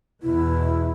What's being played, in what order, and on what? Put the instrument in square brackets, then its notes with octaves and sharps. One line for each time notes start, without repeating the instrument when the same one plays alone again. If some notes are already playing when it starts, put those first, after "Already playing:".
[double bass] E2 B2 [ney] E4